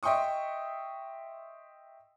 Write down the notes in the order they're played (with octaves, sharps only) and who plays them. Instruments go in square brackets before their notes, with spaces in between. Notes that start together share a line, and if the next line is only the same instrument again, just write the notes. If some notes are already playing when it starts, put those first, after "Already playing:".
[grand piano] D#5 E5 G5 C6 C#6 D#6